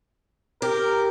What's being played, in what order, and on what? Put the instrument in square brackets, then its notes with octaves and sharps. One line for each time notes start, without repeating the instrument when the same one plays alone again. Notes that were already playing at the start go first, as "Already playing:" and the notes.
[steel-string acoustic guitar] G4 [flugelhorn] A#4